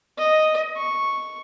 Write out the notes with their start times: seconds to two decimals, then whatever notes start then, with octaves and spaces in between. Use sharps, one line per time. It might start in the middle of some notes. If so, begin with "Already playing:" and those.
0.18 D#5
0.77 C#6